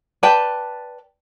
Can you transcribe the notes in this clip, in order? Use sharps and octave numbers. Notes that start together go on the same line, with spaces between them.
B4 D5 G5 A5